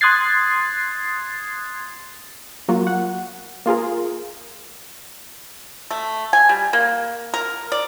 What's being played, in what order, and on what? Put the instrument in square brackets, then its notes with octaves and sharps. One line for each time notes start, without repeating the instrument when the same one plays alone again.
[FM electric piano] C6 D#6 F#6 G#6 A6 C7
[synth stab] F#3 A#3 F4 F#4
F#5
A#3 F4 G#4 A#4
[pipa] A3
G#5
G3
A#3
A#4
D5